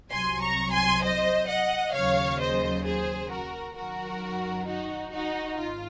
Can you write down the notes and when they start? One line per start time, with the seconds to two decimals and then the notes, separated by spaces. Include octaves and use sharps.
0.11 C2 C3 F#3 G#5 C6
0.42 A#5 C#6
0.72 G#5 C6
1.03 C5 D#5
1.48 D#5 F#5
1.94 D#2 C#3 F#3 C#5 F5
2.39 C5 D#5
2.85 G#4 C5
3.31 F#4 A#4
3.76 F#2 D#3 F#3 F#4 A#4
4.67 D#4 F#4
5.13 D#4 F#4
5.58 G#1 F4